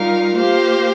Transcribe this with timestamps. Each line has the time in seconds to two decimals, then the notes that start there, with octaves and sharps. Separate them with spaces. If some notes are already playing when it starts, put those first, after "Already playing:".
Already playing: G3 D#4 F4 A#4 F5
0.36 A#3 G4 C5 F5